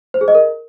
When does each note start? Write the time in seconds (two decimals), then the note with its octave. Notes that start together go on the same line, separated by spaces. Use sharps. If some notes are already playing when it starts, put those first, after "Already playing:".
0.14 C5
0.21 G#4
0.28 D#5
0.35 A#4